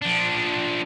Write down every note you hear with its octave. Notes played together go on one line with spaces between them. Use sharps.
F3 D4